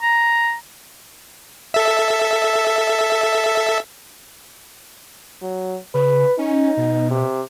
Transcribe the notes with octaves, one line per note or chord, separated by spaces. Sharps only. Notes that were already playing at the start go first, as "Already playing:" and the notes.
A#5
A4 E5
F#3
C#3 B4
C#4 D#4
B2
C3